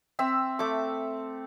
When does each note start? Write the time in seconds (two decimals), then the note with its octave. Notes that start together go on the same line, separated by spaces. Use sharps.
0.19 C4 E5 E6
0.59 A3 D6